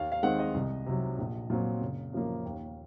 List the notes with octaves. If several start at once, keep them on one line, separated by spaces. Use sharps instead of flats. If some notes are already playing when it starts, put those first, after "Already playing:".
Already playing: D#2 F5
F5
D#3 G#3 C4 F#5
D#5
C2
C3 F#3
A#1
A#2 F#3 C4
F#1
F#2 F3 A#3
D#2